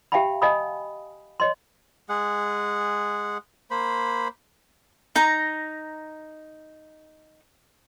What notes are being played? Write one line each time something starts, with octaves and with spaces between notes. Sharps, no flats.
G4 E5 F5 G5 A5 B5
D#5 F5 G#5 A5 B5 D#6
C#5 D#5 C6
G#3 G#4 F#5
A#3 C5 B5
D#4 A#5